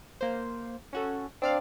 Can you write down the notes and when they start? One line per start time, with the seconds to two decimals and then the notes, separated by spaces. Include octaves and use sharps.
0.21 A#3 C5
0.93 C#4 F#4 A4
1.42 C4 D4 D5 F5